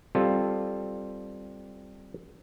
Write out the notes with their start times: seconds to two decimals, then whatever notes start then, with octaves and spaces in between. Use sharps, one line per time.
0.15 G3 C4 F4 A4